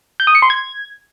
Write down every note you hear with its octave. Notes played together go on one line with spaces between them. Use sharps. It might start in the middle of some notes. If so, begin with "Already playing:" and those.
G6
D#6
C#7
C6
G#6